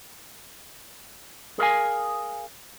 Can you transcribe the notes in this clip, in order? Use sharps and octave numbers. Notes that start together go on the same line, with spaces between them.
G#4 A#4 D#5 F5 G#5